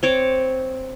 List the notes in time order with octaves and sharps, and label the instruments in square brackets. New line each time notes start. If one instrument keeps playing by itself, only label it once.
[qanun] C4 C#5 D6